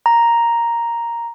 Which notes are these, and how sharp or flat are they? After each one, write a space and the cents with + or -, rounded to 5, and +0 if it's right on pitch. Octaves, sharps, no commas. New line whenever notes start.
A#5 +0